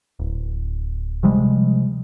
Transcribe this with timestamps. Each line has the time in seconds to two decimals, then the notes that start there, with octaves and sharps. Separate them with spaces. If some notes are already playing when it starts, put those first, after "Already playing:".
0.20 D1
1.23 C3 F3 G3 G#3